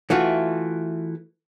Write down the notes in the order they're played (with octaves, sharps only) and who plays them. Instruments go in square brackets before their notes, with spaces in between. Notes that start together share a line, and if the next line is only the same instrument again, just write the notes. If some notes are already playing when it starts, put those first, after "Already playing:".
[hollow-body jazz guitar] E3 A3 F4 F#4